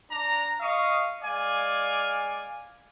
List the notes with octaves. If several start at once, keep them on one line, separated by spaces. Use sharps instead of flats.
D4 A#5
D#5 F5 C#6 D#6
G#3 D5 F5 G#5